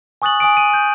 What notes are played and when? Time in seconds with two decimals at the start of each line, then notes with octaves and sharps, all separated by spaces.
0.22 G#5 C#6 D#6 F#6 A6 F#7
0.40 G#5 D#6 D7
0.57 D#7
0.73 G6